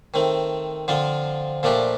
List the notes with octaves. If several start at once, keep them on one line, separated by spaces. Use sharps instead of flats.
D#3 A3 C4
D3 F3 C4 F4
A#2 F3 A3 D4 G4